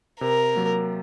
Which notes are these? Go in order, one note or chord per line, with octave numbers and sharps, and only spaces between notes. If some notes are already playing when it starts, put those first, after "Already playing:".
C3 A#4
F#3 A#3